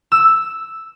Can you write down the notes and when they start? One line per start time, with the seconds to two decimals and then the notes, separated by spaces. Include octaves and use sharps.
0.12 E6